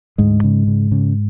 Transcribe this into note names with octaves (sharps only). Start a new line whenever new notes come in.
D2 G#2 G#3
C#3
C#3
C#3